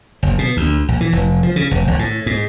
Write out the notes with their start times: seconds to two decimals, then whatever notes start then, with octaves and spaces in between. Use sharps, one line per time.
0.23 F#1
0.38 B2
0.57 D2
0.88 A#1
1.01 E3
1.12 F1
1.43 F3
1.56 C#3
1.71 F1
1.87 G#1
1.99 A2
2.26 G#2